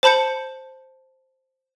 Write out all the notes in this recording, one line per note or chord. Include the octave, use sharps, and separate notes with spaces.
C5 A5 B5 G6 C#7